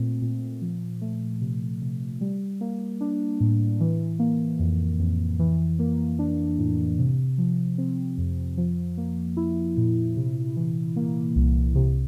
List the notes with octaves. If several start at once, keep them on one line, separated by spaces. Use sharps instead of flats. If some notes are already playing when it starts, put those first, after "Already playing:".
Already playing: A#2 A3 C4
A#2
F3
A3
C3
C3
G3
A#3
D4
A2
E3
A#3
F2
F2
E3
A#3
D4
A2
C3
F3
C4
F2
F3
A#3
E4
A#2
C3
E3
A#3
C2
C3